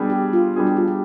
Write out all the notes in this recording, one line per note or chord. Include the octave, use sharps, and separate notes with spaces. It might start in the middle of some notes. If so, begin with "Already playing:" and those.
Already playing: B2 G3 D4 G#4
G4
F4
B2 G3 D4 G#4
G4
F4
G4